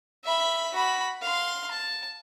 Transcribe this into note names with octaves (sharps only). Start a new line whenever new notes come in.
E5 B5
F#4 B5
F5 C6
A5